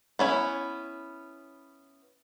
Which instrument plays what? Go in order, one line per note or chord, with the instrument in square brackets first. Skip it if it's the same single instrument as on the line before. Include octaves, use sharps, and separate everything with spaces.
[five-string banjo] B3 C#4 E4